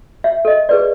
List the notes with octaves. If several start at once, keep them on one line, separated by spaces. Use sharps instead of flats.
E5
A4 D#5
G#4 B4 D5